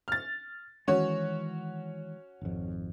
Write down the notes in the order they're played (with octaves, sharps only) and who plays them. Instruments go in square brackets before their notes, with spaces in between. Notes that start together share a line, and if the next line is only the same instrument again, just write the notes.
[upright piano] F6 A6
[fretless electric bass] D#3 E3 G#3 [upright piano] C#4 F#4 C#5
[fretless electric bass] G#1 F2